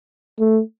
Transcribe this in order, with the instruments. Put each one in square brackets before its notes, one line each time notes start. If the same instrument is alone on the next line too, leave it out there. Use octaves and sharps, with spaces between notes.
[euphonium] A3